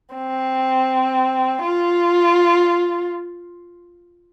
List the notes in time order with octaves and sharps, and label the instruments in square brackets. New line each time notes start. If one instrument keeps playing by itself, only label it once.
[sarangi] C4
F4